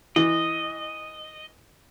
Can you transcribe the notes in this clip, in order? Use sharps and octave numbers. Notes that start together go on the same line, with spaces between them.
E3 D#5